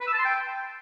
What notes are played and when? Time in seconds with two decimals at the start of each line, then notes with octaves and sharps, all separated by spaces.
0.01 B4
0.07 E6
0.13 A5
0.19 C6
0.25 G5